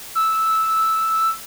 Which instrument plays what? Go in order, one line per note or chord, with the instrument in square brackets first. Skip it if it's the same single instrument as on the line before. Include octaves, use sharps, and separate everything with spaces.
[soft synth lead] E6